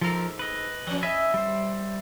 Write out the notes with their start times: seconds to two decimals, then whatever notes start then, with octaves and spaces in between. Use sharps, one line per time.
0.01 G#2 F3 A4 A#4
0.39 B4 D#5
0.87 F3 C#4
1.03 D#5 E5 G#5 B5
1.34 G3 C5